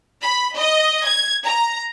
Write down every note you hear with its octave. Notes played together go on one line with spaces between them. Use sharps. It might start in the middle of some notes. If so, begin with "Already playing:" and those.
B5
D#5
G#6
A#5